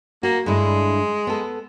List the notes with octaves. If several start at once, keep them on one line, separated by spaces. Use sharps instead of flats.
A#3 F#4
G2 D3 G#3 E4
B3 A4